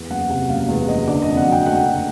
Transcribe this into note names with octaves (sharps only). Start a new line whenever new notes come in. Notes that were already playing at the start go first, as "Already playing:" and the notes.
Already playing: E2
F#1 F#5
C3 F#5
F#1 F5
E2
F#1 D#5
D3 D5
D#5
F2
F#5
F#3
G5
A3 F#5
D3